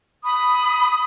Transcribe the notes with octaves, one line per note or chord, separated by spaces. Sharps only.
B5 D#6